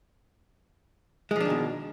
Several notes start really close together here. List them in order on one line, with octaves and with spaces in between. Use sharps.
G#3 F3 D4 D#3 B2